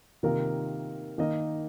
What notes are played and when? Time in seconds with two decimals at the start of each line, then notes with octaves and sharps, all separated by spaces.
0.23 C3 D#3 A#3 F4 A#4
1.18 D#3 A#3 D#4 A#4 D#5